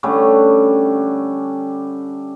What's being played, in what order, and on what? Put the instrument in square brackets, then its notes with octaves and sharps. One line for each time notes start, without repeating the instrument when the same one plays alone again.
[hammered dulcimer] D3 G3 A3 C#4